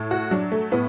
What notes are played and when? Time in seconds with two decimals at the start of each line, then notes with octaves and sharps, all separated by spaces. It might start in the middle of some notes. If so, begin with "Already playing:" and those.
Already playing: A2
0.11 F#4
0.31 F#3 D4
0.52 A3
0.71 A2 B3